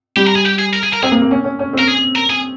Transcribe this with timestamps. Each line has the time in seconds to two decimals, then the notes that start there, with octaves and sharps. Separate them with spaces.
0.17 G3 G4
0.27 A#4
0.36 G#4
0.46 G4
0.59 G#4
0.74 A#4
0.83 G#4
0.93 A#4
1.03 C4 G#4
1.12 A#3
1.22 A#3
1.31 C#4
1.44 C#4
1.59 C#4
1.73 C4
1.79 A#4
1.87 G#4
2.16 A#4
2.30 G#4